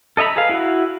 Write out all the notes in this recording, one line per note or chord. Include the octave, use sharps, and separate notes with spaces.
A4 D#5 E5 A#5 B5
G#4 A4 B4 F5
E4 F#4